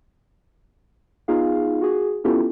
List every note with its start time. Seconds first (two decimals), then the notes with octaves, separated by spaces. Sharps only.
1.28 B3 D#4 F4 G#4 F5
1.82 F#4 G#4
2.24 B3 C#4 E4 F4 G4 A4